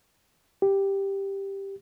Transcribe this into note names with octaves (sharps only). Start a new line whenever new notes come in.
G4